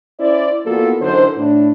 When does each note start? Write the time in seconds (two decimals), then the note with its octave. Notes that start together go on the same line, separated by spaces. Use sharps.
0.19 C#4 E4 C5 D5
0.65 E3 A#3 B3 F4 F#4 A4
1.02 F#2 D3 E3 D#4 C5
1.36 A2 D4